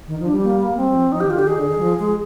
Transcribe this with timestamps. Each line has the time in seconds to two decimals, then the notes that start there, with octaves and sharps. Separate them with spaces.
0.08 D#3
0.17 F3 D#4
0.25 D4
0.31 G3
0.43 A#3
0.61 A#3
0.77 G3 C4
0.90 G3
0.95 F3
1.12 F3 D#4
1.20 D#3 G4
1.30 F4
1.35 D3
1.39 G4
1.46 D#3 G#4
1.58 D3
1.70 D#3
1.78 G3
1.82 F3
1.99 G#3